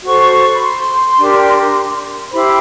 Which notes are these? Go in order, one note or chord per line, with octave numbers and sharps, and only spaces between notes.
F#4 A4 C5 C#6
B5
C6
D4 G4 A#4
E4 G4 C5 B5